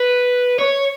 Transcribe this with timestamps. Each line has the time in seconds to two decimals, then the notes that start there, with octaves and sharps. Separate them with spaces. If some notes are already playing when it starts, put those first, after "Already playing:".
Already playing: B4
0.59 C#5